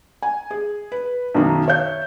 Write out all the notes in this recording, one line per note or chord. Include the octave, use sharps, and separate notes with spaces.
G#5
G#4
B4
B1 F#2 D#3
C#5 E5 F5 G6